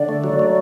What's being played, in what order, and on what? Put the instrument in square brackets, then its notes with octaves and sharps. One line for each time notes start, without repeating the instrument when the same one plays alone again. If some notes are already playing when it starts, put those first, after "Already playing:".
Already playing: [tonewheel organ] D3 [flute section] D5
[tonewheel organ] A3
F#3
A3